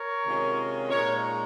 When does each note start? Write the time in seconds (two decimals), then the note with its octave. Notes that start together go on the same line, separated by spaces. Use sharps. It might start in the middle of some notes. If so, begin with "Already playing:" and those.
Already playing: A#4 C#5
0.25 C3 D#3 G#3 C#4 F4
0.90 A#2 G#3 D#4 A#4 C#5